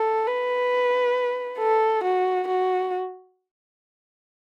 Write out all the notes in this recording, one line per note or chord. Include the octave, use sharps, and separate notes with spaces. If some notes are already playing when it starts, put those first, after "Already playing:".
Already playing: A4
B4
A4
F#4
F#4